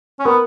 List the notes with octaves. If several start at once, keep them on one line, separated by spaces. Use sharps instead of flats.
C#4
B3 A#4